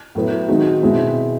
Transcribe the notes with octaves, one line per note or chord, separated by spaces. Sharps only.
A2 F#3 B3 E4
D#3 G#3 C4 D#4 F#4
B2 G#3 C4 E4